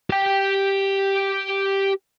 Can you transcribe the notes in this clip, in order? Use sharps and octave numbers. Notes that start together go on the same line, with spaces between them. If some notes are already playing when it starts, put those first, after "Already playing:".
G4 G5